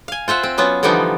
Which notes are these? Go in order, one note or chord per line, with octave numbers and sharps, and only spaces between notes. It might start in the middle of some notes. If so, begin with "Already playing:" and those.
F5 G#5
F4 C5 E5 F#5
C4
F#3 B3 C#4 F4
D3 E3 F3 G3 B3 D#4